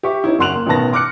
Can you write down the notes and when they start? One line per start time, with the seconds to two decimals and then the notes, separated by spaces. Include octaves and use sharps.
0.03 G4 E5 C#6
0.24 C#4 D#4 E4
0.39 F#1 F#4 C6 F#6 F7 F#7
0.54 A#3
0.66 A1 B2 D#3 B4 A5 A#6
0.92 C6 D6 F6 F#6 C#7